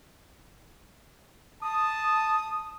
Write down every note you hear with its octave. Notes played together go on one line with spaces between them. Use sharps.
A5 D#6